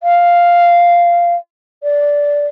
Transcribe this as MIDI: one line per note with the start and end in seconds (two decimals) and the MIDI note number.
0.03 1.35 77
1.83 2.47 74